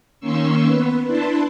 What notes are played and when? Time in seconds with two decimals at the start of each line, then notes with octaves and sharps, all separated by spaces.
0.20 D#3 A#3 C#4 C6 C#6 E6
0.66 B3 B4
1.06 D4 E4 B4 A5 C6